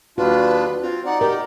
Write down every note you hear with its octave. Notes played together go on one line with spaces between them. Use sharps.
D#2 D4 F4 F#4 B4
C4 F4
D#4 D5 F#5
G4 A#4